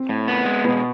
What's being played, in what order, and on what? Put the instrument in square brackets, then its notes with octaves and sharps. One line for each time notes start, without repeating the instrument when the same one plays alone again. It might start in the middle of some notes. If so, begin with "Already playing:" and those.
Already playing: [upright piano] C4
[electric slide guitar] A2
B3
G#3
[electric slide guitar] B2 [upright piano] B3